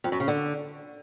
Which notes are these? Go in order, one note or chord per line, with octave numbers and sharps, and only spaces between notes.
F2
F#2
C#3
D3